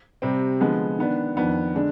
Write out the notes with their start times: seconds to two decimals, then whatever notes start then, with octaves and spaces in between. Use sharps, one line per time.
0.22 C3 G3 C4
0.60 D3 F3 G#3 B3
0.98 D#3 B3 D4
1.36 F2 D#3 B3 D4
1.75 D3 G#3 D4